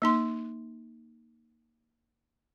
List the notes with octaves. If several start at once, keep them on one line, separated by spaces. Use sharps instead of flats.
A#3 D#4 C6